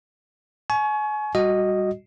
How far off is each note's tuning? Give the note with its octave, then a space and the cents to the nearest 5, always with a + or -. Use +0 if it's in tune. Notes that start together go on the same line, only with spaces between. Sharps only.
G#5 +35 C#6 +5
G3 +0 F#4 +0 D#5 +0